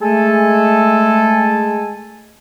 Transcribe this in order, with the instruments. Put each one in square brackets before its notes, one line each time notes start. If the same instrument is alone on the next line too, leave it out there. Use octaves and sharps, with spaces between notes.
[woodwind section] G#3 A3 A4 G#5